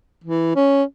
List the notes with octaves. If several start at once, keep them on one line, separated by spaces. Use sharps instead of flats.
E3
C#4